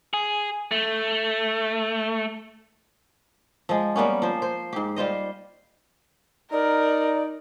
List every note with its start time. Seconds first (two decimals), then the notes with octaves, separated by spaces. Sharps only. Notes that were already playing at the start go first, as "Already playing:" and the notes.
0.14 G#4
0.71 A3
3.69 F3 G#3
3.96 G3 A#3 B3 C#4
4.22 F3 C5
4.42 C5
4.73 G#2 G4
4.96 G3 F4 C5 D#5
6.52 D#4 A#4 D5